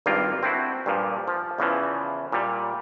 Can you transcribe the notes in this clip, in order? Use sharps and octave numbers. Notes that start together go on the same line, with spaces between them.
G#1 G2 A#3 C4 F4
C4 D4 E4 F#4
G2 A#2 F3
F3
E2 C#3 E3 F3
A#2 G3